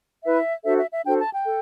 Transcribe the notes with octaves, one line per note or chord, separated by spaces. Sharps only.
E4 B4 E5
D4 F#4 A4 C5 E5
E5
E5
D4 F#4 A4 C5 G5
A5
G5
A4